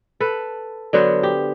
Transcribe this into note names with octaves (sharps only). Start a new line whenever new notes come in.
A4 B4
D3 F#3 B3 C5
G4